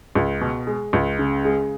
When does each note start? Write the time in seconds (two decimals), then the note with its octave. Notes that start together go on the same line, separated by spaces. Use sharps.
0.15 C#2
0.41 B2
0.67 G#3
0.93 C#2
1.19 C#3
1.45 G#3